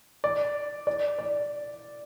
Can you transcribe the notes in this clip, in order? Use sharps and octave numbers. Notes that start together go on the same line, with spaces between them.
D5
D5
D5